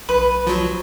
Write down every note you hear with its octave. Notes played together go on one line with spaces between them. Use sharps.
B1 B4
F3 F#3